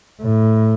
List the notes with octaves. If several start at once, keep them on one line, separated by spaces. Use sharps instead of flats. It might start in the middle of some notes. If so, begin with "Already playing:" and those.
A2